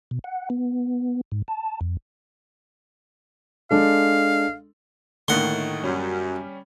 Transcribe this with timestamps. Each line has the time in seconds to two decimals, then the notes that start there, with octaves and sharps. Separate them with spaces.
0.11 B2
0.24 F#5
0.50 B3
1.32 G#2
1.48 A5
1.81 F2
3.71 G#3 D4 A4 F5
5.28 A2 D3 D#3 A3 A#3 F#5 C6
5.83 F#2 G3 C#4